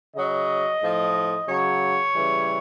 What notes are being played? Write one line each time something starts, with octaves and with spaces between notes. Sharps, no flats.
C#3 F#3 D#5
A2 F3
C#3 F#3 C#5
C#3 E3 G3